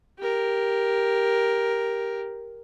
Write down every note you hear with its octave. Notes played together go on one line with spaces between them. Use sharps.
G4 A#4